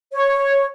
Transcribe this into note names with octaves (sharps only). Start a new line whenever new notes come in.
C#5